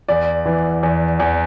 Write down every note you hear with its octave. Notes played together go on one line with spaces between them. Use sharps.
E2 D5
E3
E2
E2